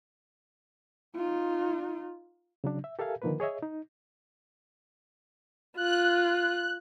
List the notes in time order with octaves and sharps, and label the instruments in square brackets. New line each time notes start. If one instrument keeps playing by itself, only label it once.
[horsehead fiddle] D#4 F4
[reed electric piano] C#3 F#3 D4
E5
G4 A4 A#4 E5 F5 G#5
D3 D#3 F3 A#3 A#4 B4
G#4 C#5 D#5 E5
D#4
[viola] F4 [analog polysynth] F#6